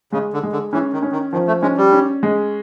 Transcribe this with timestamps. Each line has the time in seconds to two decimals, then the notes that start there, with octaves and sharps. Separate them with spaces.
0.12 C#3 G#3
0.33 D3
0.43 G#3
0.53 D3
0.73 E3 C#4
0.93 D#3
1.03 C#4
1.12 D#3
1.33 D#3 F3
1.48 A3
1.62 G#3 C#4
1.77 G3
1.92 C#4
2.23 G#3